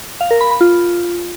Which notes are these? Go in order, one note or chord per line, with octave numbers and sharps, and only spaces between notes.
F5
A#4
B5
B5
F4